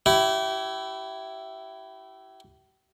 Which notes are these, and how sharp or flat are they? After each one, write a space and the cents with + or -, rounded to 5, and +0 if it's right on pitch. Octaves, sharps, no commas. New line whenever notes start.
E4 +5 G4 -35